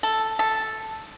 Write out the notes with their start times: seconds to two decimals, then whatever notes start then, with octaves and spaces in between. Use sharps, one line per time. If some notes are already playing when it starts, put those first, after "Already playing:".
0.03 A4
0.39 A4